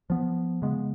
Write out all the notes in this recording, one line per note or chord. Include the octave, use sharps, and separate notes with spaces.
F3 B3
C#3 G#3 B3